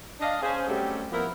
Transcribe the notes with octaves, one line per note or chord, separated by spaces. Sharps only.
D4 D#5 F5
C#4 G#4 C5
F#3 G3 A3 C4 C#4 G4
F3 B3 E4 F#4 A#4